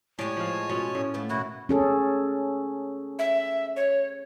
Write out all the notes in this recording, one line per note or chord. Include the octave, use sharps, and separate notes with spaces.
A2 G#3 G4 C#5 D5 G#5 A5
F3 D#5 F5
B2 C#4 F4
A2 C#4
A3 B3
E2 B2 D#3 C#4 E4 F#4 F#5
C#4 G#4 A4
E5
C#5